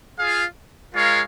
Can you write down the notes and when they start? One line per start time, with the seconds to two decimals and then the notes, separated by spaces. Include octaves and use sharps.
0.18 F4 G#4 F5
0.94 G#3 F4 A#4 C#5 F5